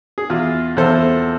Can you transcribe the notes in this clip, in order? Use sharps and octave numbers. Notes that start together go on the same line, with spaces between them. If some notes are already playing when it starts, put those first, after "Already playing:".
G#4
E2 F4
E2 A4 C5